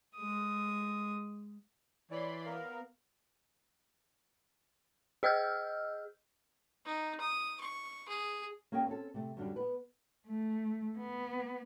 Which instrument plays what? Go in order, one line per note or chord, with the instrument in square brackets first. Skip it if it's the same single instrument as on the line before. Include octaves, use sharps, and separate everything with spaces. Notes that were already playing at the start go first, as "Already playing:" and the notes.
[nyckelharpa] G#3 D#6
[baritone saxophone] E3 [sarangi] C#5 [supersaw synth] D5 B5 C6
[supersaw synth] B3 A#4 [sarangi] F5
[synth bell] G#4 D#5 E6 F6 G6
[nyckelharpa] D#4
D#6
C#6
G#4
[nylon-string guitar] A#3 C#4 G#4 A#4 G5
C4 C#4 A4
C3 A3
F#2 D3 G3
B3 B4
[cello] A3
B3